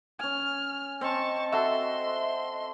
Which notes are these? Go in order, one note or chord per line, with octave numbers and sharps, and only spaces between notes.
C#4 G#5 F6
C4 D#5 A5 C#6
F#4 A4 E5 C6